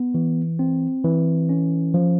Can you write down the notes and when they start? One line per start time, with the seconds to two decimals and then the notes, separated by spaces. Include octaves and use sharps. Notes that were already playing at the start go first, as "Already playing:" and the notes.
Already playing: B3
0.14 E3
0.59 C4
1.04 E3
1.49 C#4
1.94 F3